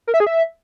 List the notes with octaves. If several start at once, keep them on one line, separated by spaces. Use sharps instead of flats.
A#4
E5
G#4
E5